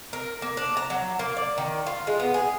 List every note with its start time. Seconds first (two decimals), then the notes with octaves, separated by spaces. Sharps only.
0.13 A#4
0.42 A#3
0.57 D4
0.77 A#5
0.90 F#3
1.19 A#3
1.37 D5
1.58 D#3
1.86 F4
2.07 G#3
2.20 B3
2.34 G#4